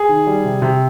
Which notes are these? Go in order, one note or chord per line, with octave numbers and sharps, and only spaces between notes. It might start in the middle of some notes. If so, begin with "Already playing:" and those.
Already playing: G#4
D#3
G3
C3
C3